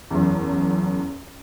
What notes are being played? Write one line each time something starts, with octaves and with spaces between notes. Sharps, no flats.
F#1 E2